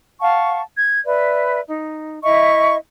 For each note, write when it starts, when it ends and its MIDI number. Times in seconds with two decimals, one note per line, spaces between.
0.21 0.60 77
0.21 0.60 78
0.21 0.60 81
0.21 0.60 85
0.76 1.00 92
1.05 1.59 71
1.05 1.59 74
1.05 1.59 76
1.66 2.18 63
2.23 2.75 64
2.23 2.75 75
2.23 2.75 76
2.23 2.75 85